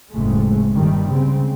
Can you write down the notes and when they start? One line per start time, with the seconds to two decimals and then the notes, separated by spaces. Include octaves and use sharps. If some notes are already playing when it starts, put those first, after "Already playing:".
0.11 F#1 F2 A2 G#3 A3
0.71 G2 A#2 D#3 G3 A3
1.10 C#2 C#3 C4